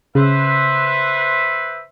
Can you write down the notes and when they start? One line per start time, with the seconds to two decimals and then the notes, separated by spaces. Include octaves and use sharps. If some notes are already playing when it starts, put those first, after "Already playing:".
0.15 C#3 B4 C5 E5